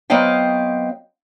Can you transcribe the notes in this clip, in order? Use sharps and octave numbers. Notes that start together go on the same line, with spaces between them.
F#3 B3 C4 D#5 F5 G5